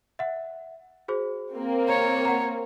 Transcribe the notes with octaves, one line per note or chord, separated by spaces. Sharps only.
E5 F#5
F#4 G#4 C5
A#3 C4
C#5 A#5
F#5 A#5